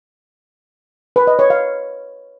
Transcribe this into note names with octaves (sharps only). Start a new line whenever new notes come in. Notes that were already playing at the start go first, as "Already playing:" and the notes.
B4
D#5
C#5
F5